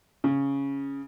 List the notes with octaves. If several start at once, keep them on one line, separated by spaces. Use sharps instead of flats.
C#3